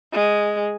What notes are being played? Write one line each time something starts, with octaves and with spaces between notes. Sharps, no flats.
G#3